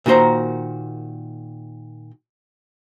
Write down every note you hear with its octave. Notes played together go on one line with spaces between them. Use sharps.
A#2 D#3 F#4 C5 A#5